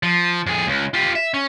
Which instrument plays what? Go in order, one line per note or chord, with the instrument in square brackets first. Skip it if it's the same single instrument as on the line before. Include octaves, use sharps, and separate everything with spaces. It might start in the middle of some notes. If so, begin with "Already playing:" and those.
[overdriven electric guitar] F3
F2 G#4
C#2
F4 G4
E5
C#4